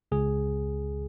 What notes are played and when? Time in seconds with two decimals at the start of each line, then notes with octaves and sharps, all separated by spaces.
0.12 C#2 G#4